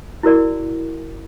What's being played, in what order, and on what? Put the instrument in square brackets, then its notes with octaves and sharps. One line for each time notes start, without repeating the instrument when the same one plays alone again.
[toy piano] E4 F#4 A#4 D5